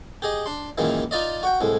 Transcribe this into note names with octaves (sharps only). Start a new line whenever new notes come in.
G4 G#4 D#5
D4 C6
F#2 A#2 D#3 E3 G#3
D#4 F4 D5 D#5
F#4 F#5 G5
C2 A2 G#3